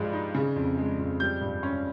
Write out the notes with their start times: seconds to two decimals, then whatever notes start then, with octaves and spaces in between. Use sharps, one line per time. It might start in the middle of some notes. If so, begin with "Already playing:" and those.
Already playing: G2 F3 G#3
0.13 D#4
0.34 C#3
0.56 F2
0.77 G#3
0.99 F2
1.20 G3 G6
1.41 G2
1.63 C#4